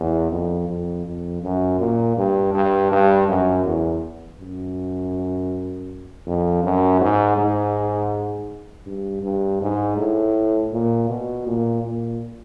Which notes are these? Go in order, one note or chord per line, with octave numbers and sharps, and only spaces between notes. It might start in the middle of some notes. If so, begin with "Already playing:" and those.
Already playing: E2
F2
F2
F2
F#2
A#2
G2
G2
G2
F#2
E2
F#2
F2
F#2
G#2
G#2
G2
G2
G#2
A2
A#2
B2
A#2
A#2